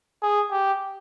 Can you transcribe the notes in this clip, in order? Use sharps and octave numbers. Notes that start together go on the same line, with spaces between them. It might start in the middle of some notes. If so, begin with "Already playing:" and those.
G#4
G4